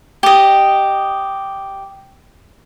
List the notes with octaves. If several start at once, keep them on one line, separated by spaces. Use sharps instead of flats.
G4 D#5